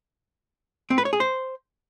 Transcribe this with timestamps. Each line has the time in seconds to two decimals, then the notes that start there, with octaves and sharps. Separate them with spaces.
0.90 C4
0.98 B4
1.05 C#5
1.13 G#4
1.20 C5